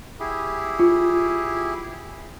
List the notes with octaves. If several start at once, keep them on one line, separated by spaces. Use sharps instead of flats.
E4 G4 G#4
F4